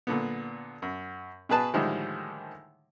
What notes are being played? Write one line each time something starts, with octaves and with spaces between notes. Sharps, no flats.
A#2 D3 B3
F#2
B2 G#4 B4 A5
A2 D3 D#3 F3 G3 G#3